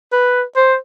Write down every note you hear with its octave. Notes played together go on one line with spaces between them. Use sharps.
B4
C5